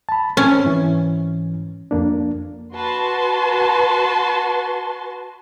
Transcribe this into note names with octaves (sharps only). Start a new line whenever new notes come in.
A5 B5
C4 C#4
G#2 E3
F2 A#3 D4
F#4 B4 A5 C6